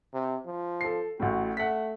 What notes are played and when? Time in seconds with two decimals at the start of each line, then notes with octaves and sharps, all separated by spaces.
0.13 C3
0.46 F3
0.81 A4 C7
1.20 A1 A2 F#4
1.57 A3 F#5 B6